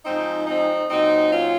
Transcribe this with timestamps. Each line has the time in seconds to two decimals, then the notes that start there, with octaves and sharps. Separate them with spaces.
0.05 G#2 F3 C4 D#4
0.47 C4 D#4
0.90 A#2 F#3 C4 D#4
1.33 C#4 F4